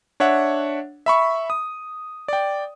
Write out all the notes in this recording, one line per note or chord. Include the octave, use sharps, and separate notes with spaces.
D4 C#5 E5 F#5
E5 B5 C#6
D#6
D5 G5